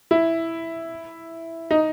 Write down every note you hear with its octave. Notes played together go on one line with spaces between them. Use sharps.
E4
D#4